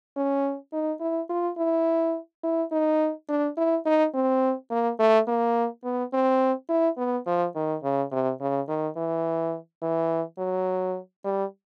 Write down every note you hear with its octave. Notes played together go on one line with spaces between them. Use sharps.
C#4
D#4
E4
F4
E4
E4
D#4
D4
E4
D#4
C4
A#3
A3
A#3
B3
C4
E4
B3
F3
D#3
C#3
C3
C#3
D#3
E3
E3
F#3
G3